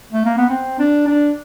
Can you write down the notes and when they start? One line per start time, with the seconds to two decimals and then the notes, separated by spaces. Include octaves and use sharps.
0.12 A3
0.25 A#3
0.37 B3
0.49 C4
0.79 D4
1.07 D4